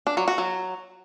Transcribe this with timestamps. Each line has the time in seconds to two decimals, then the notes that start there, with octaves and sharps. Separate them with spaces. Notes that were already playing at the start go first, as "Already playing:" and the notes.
0.07 D4
0.17 F#3
0.28 F#4
0.38 F#3